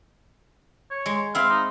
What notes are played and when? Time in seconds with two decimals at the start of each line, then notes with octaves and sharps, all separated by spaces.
0.90 C#5
1.06 G#3
1.35 C4 E4 F5
1.50 D#4